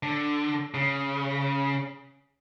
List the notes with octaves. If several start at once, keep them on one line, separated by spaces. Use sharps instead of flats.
D3
C#3